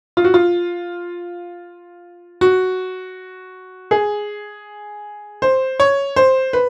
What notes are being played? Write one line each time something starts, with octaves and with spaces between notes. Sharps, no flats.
F4
F#4
F4
F#4
G#4
C5
C#5
C5
B4